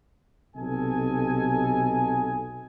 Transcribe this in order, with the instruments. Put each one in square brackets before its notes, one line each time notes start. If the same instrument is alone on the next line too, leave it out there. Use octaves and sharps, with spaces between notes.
[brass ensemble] B1 C3 A4 D#5 G#5